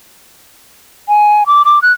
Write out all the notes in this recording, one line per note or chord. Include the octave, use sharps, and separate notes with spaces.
G#5
D6
D6
F#6